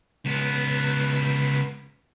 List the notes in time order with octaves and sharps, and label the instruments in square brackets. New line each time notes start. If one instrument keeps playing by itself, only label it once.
[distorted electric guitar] C#2 B3